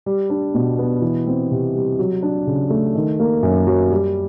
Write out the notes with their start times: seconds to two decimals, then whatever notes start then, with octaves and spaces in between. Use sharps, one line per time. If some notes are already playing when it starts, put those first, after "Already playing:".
0.06 G3
0.30 D4
0.54 B2
0.79 B3
1.02 E3
1.27 C4
1.51 C3
1.75 G3
1.99 F#3
2.23 D4
2.47 C#3
2.70 A3
2.95 D#3
3.20 A#3
3.42 F#2
3.67 F#3
3.91 G3